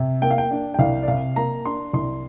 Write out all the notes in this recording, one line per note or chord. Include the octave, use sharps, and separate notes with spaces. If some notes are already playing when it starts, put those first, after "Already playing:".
Already playing: C3
A#3 G5
F5
G5
D4
G5
C2 F5
D5
C3 F5
A#3 A#5
D4 C6
C2 C6